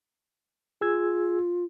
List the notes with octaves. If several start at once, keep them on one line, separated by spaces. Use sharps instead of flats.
F4 G#4 E6 G#6